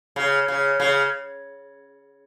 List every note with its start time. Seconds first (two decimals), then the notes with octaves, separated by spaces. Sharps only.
0.16 C#3
0.48 C#3
0.80 C#3